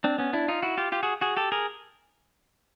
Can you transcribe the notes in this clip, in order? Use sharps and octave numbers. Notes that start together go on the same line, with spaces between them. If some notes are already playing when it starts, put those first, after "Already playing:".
C4 D4
B3 C#4
D4 E4
D#4 F4
E4 F#4
F4 G4
F4 G4
F#4 G#4
F#4 G#4
G4 A4
G#4 A#4